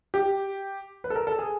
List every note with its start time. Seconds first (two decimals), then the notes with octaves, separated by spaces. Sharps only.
0.14 G4
1.04 B4
1.10 A4
1.15 A#4
1.27 A4
1.39 G#4